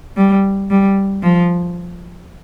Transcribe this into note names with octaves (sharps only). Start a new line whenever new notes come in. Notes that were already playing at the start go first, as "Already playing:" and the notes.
G3
G3
F3